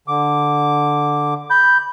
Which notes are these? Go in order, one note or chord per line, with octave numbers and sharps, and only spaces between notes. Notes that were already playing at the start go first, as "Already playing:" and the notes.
D3 D6
B5 G6